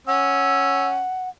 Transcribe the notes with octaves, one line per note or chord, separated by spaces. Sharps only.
C#4 F#5 E6